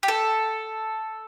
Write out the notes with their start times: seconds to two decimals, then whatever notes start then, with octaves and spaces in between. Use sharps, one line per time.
0.03 G4
0.08 A4